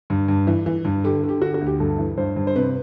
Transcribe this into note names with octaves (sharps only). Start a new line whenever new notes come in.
G2
G2
E3
E3
G2
D3 G4
D3
G4
D3 F#4
F#4
D2
G4
G2 A4
E3
G2 C5
G2
C5
C3 B4